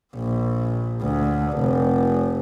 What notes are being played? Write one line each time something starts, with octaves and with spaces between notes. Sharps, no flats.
A#1
D2
F1